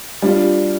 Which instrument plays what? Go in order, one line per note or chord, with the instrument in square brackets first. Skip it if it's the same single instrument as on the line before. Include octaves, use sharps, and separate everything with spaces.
[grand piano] G3 D4 F4